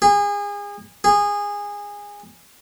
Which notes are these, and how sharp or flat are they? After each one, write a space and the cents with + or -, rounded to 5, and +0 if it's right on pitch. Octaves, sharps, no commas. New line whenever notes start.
G#4 -30
G#4 -20